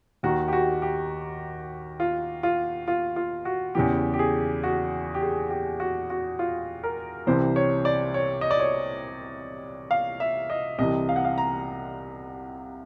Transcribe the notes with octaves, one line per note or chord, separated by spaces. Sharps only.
D#2 D#3 F#4
G4
F#4
G4
F4
F4
F4
F4
F#4
E2 C#3 E3 G4
G4
G#4
F#4
G4
G#4
G4
F#4
F#4
F4
A#4
C2 C3 E3 C5
C#5
D5
C#5
D#5
D5
C#5
F5
E5
D#5
C2 C3 E3 D#5
F5
F#5
F5
A#5